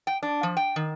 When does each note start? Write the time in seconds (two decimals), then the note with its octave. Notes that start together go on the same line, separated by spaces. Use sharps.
0.07 G5
0.23 D4
0.43 F3
0.57 G5
0.76 D#3